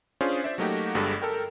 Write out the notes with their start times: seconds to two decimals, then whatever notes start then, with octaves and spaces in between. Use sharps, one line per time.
0.21 C#4 D4 F4 G#4 C5
0.44 C5 D5 E5
0.58 F#3 A3 A#3 D#4 F#4 G4
0.94 G1 G2 G3 G#3 A4
1.22 A4 A#4 G5